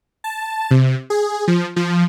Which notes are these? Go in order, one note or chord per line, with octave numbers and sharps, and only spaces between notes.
A5
C3
G#4
F3
F3